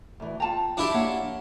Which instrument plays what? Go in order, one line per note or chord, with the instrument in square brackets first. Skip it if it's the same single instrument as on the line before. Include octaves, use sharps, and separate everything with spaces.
[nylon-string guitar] D2 E3
[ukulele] F4 A5 A#5 [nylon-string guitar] G5
[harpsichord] D4 E4 G4
[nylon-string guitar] A#3 [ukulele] C#5 F#5